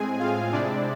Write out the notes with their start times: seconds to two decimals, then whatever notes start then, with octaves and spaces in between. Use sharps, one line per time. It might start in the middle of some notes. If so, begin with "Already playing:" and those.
Already playing: A2 G#3 C4 G#4 G#5
0.19 F4 F5
0.52 C3 G#3 C4 D4 E4 D5